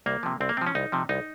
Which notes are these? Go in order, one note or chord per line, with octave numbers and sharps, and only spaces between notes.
C2 A#3
C3 F3
C2 C4
A#3
C3 F3 C4
C#4
C2 D#4
C3 F3
C2 D#4